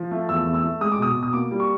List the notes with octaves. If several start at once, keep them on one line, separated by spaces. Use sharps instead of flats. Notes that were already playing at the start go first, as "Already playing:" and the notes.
Already playing: F3
A3
E2 E6
E2
E6
A3
G#3 D#6
D6
B2 D#6
B2
D#6
A#3 D6
G3
C#6